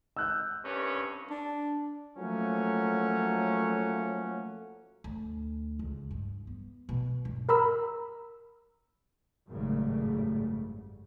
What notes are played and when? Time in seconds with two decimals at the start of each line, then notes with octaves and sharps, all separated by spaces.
0.17 E6 F#6 G6
0.63 C2 G2 C#4
1.30 D4
2.17 F3 F#3 A3 A#3 C#4 F#5
5.04 D2
5.79 C#2
6.11 G2
6.47 B3
6.89 B2
7.25 G2
7.49 A#4 A#5 B5 E6
9.49 G#1 F#2 A2 C#3 G3 A3